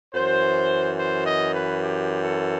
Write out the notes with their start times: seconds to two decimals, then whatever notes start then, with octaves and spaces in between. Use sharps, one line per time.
0.13 F#2 E3 C5
0.98 C5
1.26 D#5
1.54 B4
1.83 G4
2.24 A4